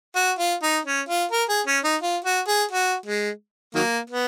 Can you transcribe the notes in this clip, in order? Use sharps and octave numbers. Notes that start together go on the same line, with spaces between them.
F#4
F4
D#4
C#4
F4
A#4
G#4
C#4
D#4
F4
F#4
G#4
F#4
G#3
D#3 F#3 A#3
B3